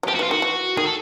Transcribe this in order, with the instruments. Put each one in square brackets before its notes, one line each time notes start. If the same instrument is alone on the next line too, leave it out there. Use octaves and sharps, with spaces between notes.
[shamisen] F#3
[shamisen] F3 [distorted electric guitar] G4
[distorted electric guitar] F#4
[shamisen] E3
[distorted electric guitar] F4
[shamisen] D#3 [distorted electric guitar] F#4
[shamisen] E3
[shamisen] D#3 [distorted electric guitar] G#4
[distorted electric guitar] A4